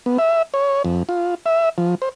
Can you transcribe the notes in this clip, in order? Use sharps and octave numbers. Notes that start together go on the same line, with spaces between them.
B3
E5
C#5
F2
F4
E5
F3
C5